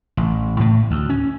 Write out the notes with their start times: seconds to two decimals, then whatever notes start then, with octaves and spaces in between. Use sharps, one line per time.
0.17 A1
0.60 A2
0.91 D2
1.10 C#4